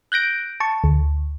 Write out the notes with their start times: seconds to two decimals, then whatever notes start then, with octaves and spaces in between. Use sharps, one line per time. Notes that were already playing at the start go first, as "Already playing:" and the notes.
0.12 F#6 G6 A#6 D7
0.60 A5 C#6
0.84 D2